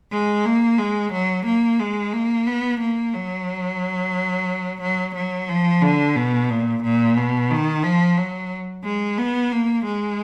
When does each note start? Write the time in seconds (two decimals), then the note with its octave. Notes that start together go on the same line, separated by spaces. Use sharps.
0.12 G#3
0.45 A#3
0.78 G#3
1.12 F#3
1.46 A#3
1.79 G#3
2.13 A#3
2.47 B3
2.80 A#3
3.14 F#3
4.81 F#3
5.15 F#3
5.49 F3
5.82 D3
6.16 B2
6.50 A#2
6.83 A#2
7.17 B2
7.51 D#3
7.83 F3
8.17 F#3
8.85 G#3
9.18 B3
9.52 A#3
9.85 G#3